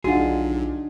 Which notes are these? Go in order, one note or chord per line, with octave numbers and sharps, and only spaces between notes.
B1 D4 D#4 F4 F#4 G#4 F#5